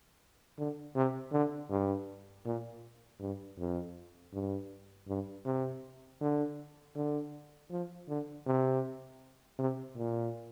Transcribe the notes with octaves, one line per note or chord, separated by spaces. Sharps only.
D3
C3
D3
G2
A#2
G2
F2
G2
G2
C3
D3
D3
F3
D3
C3
C3
A#2